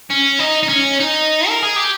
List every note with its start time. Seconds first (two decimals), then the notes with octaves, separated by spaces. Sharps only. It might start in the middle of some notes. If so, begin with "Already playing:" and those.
0.10 C#4
0.39 D#4
0.63 D#4
0.69 C#4
1.00 D#4
1.49 A#4
1.62 G#4
1.76 G4